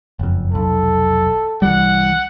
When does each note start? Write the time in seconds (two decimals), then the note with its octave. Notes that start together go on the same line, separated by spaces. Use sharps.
0.19 F#1 F2
0.52 F1 B1 A4
1.62 C2 E3 G3 F#5